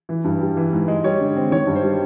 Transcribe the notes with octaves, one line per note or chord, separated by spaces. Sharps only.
E3
G2
G3
E3
G#2
G#3
G3 C#5
D3
C4
D#3 C#5
G2
C5
G3